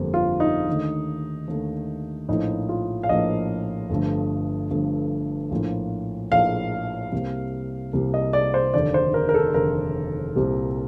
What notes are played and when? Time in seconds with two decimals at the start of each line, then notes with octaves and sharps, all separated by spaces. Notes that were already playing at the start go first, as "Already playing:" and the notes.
Already playing: G1 F2 D3 G3 A#3
0.14 F4
0.40 D#4
0.68 D#2 D3 A3
1.48 D#2 D3 A3
2.29 A#1 A2 F3 A#3 D#4
2.69 F4
3.03 F5
3.09 A#1 A2 F3 A#3 D#5
3.90 G1 G2 F3 A3
4.70 G1 G2 F3 A3
5.51 A#1 A2 F3 A#3 F4
6.31 A#1 A2 F3 A#3 F4 F5
7.12 C2 C3 G3 A#3
7.93 C2 C3 G3 A#3
8.14 D#5
8.33 D5
8.54 C5
8.74 F1 D#2 D3 D5
8.94 C5
9.14 A#4
9.29 A#4
9.34 A4
9.54 F1 D#2 D3 A#4
10.36 C2 A#2 G3 C4 G4